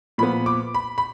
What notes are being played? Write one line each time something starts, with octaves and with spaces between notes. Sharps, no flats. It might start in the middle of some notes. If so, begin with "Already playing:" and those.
A#2 F3 B3 B5
D6
B5
B5